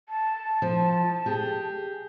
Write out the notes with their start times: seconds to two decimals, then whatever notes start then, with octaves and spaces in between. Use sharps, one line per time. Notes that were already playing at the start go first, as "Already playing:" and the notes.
0.09 A5
0.62 F3
1.26 G4 G#4